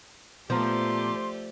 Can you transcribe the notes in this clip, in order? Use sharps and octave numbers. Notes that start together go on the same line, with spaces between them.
A#2 F3 A3 B3 G4 D5 A#5 C6